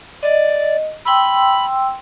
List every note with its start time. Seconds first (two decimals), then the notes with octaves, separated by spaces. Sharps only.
0.23 D5 D#5
1.05 G5 B5 C6 E6